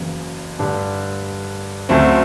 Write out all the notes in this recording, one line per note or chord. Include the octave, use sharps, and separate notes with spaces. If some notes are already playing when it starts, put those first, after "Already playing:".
Already playing: F#1 E2 C#3 F#3
G2 D3 G3
D2 C#3 F#3 A3 C4